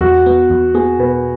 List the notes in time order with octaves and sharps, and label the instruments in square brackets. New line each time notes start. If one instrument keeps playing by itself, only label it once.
[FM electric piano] E2 [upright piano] F#4
[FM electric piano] B3
E2
[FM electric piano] B3 [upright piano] G#4
[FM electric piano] B2 [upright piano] B4